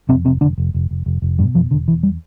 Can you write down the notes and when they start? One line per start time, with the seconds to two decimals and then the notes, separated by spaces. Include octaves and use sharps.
0.09 F2 C3 C4
0.25 F1 C3 C4
0.41 F1 D3 D4
0.58 F1
0.74 F1
0.91 F1
1.06 F1
1.22 F1
1.38 G2 B2 G3
1.54 E1 F2 F3
1.71 E1 D3
1.88 E2 E3
2.03 G3